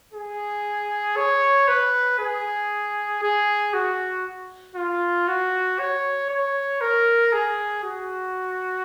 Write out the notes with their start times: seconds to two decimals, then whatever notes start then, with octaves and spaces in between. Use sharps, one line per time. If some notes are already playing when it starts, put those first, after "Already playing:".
0.14 G#4
1.17 C#5
1.68 B4
2.19 G#4
3.22 G#4
3.74 F#4
4.76 F4
5.28 F#4
5.79 C#5
6.30 C#5
6.81 A#4
7.33 G#4
7.83 F#4